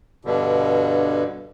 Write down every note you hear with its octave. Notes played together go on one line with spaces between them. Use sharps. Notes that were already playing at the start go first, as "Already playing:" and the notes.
G2 B2 D3